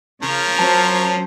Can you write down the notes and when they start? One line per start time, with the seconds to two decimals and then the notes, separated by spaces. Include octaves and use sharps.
0.23 C#3 F3 A#4 C#5
0.59 F#3 C#4 C5 A5